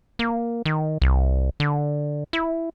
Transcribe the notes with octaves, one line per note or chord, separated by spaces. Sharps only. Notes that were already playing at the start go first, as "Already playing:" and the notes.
A#3
D#3
C2
D3
E4